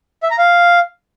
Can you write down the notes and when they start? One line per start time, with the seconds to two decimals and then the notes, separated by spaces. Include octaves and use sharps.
0.23 E5
0.31 A#5
0.38 F5